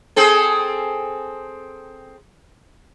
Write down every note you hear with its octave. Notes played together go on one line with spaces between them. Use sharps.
C4 G#4 A4